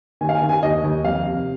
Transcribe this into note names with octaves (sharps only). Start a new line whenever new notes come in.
D#3 G#5
F5
G#5
D#3
G#5
D#2 D#5
D#2
F2 F5
C3